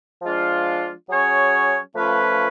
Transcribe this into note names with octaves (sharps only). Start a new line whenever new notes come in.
F3 G#3 D4 F4
F#3 C#4 G#4 C#5
F3 A3 C#4 F4 B4